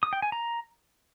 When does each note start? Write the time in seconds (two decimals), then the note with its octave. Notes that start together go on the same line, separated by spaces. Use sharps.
0.03 D#6
0.13 G5
0.22 G#5
0.32 A#5